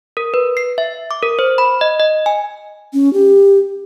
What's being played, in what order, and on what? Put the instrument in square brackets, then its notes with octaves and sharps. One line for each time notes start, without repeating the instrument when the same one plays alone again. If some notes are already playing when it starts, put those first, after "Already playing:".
[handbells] A#4
B4
C7
E5
D6
A#4
C5
B5
D#5
D#5
G#5
[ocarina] C#4
G4